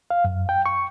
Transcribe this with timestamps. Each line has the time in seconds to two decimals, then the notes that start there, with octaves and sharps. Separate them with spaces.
0.10 F5
0.24 F#2
0.49 G5
0.66 C#6